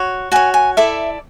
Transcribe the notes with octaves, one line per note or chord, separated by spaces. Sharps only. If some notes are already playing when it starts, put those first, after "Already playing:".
Already playing: F#4 C#5
F#4 C#5 G#5
G#5
E4 A4 D5 E5